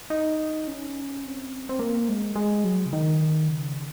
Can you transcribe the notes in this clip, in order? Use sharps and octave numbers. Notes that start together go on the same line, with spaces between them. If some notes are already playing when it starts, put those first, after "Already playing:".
D#4
C#4
C4
C4
A#3
G#3
G#3
F#3
C#3
D#3
C#3